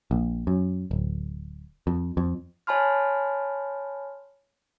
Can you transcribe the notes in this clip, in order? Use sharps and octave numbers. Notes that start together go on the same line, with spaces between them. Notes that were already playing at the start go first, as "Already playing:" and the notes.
A#1
F#2
D1
F2
F2
C#5 G#5 A5 B5 C6 F6